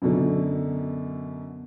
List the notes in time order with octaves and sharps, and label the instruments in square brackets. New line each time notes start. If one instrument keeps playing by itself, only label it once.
[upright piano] F#2 B2 D3